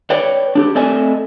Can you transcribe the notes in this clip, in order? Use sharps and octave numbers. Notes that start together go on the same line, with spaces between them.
B4 C#5 D5 G5
D4 F#4 G4
A3 C4 D5 D#5 G#5 A5